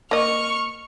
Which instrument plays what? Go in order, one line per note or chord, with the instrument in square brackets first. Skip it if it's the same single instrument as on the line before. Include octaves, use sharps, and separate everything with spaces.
[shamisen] A#3 D#5 [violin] C#6 F6